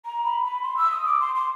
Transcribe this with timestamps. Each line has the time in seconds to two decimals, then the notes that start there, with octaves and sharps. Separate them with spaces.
0.05 A#5
0.24 B5
0.44 B5
0.63 C6
0.77 E6
0.92 D#6
1.06 D6
1.20 C6
1.35 C6